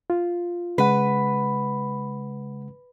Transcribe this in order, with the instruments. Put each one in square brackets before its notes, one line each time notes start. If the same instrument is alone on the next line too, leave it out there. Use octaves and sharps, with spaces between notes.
[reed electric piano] F4
[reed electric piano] C#3 G#3 F#5 [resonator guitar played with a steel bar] B4